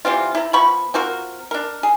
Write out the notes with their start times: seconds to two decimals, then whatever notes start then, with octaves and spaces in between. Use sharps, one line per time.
0.05 E3 G3 C4 F4
0.35 E4 A#5
0.53 F3 B3 B5 C#6
0.94 C4 F4 F#4 A#4
1.51 D4 A#4
1.83 G#4